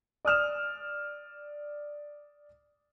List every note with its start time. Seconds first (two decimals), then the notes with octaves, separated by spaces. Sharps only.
0.25 D5 D#6 F6 E7